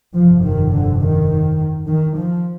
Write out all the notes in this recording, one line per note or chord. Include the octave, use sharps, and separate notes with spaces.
G1 F2 C3 F3
D#3
D3
D#3
D#3
F3